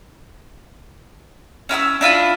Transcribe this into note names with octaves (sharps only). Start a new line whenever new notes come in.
C#4 E4 G#5 E6
D4 E4 F4 B5